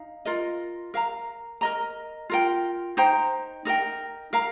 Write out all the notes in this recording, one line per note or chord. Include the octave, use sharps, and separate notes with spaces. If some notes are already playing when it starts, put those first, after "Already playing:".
Already playing: D#4 F5
F4 A#4 D#5
A#4 F5 A#5
A#4 D#5 A#5
F4 A#4 G5
D#4 C5 G5 A#5
D#4 A#4 G5
A#4 F5 A#5